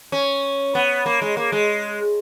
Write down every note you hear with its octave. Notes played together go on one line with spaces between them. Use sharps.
C#4
B3
A#3
G#3
A#3
G#3